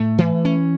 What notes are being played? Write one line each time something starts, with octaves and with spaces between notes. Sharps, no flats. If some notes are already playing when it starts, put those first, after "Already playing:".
Already playing: A2 A3
E3
C#4